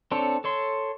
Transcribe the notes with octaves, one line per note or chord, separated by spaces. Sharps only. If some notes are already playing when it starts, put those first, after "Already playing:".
C4 D4 A4 C#5
A4 C#5 C6